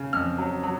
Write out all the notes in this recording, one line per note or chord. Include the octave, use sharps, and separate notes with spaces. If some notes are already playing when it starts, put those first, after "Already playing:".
Already playing: C#3
F2 F6
F#3
F#3